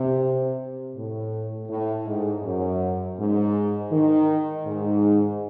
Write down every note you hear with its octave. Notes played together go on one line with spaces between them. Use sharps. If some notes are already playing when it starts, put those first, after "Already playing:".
Already playing: C3
A2
A2
G#2
F#2
G#2
D#3
G#2